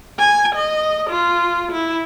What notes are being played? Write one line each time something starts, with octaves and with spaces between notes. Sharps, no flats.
G#5
D#5
F4
E4